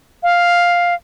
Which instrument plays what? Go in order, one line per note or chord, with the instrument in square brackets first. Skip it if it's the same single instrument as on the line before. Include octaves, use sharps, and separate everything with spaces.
[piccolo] F5